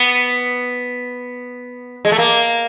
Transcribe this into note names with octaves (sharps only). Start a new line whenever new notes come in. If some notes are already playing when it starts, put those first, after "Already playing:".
Already playing: B3
G#3
A3
A#3